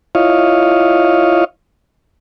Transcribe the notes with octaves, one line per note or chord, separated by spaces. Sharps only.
E4 F4 C#5 D#5 F5